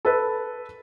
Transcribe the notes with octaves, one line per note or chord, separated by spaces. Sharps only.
A4 B4